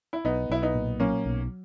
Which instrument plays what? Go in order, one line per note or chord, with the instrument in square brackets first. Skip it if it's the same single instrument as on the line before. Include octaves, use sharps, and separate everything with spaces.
[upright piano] E4
[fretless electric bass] B1 [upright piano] B3 D#4
[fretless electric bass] B1 [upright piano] E4
[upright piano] B3 D#4
[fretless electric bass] A#2
[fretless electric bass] F#3 [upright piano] A#3 C#4
[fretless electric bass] B1